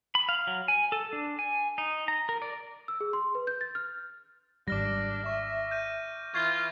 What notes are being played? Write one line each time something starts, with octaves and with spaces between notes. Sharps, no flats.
B5
F5
F#3
G#5
A4
D4
G#5
D#4
A#5
A#4
D5
E6
G#4
C6
B4
G6
A6
F6
G#1 G3 D4 D6 F6 A#6
E5 C#6
G6 D#7
E3 F4 C#6 G#6 C7